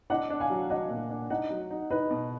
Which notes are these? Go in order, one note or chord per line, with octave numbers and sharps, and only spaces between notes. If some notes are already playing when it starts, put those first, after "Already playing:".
D4 D#5 F#5
D4
F5 G#5
F#3
D4 D#5 F#5
A#2
D4
D#4 D#5 F#5
F#3
D#4
D#4 B4 D#5
B2